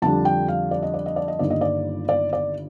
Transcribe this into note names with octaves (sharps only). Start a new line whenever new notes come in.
F2 D3 G3 D4 A5
G5
F5
D5
D#5
D5
D#5
D5
D#5
G1 G2 D#3 A#3 D5
D#5
D5
D5
D5